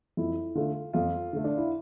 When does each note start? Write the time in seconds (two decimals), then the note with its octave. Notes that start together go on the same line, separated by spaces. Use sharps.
0.17 F2 E4
0.55 D3 A3 F4
0.93 F2 F4
1.33 D3 A3
1.44 D4
1.57 E4